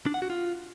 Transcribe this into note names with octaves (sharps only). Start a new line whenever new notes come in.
D4
F#5
F#4
F4